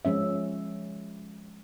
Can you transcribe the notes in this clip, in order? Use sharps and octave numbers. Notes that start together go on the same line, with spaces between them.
F3 G#3 C#4 E5